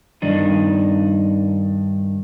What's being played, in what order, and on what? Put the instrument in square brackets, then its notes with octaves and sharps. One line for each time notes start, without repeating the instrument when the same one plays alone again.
[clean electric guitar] G2 D#3 D4 D#4